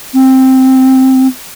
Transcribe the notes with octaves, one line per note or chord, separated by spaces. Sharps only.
C4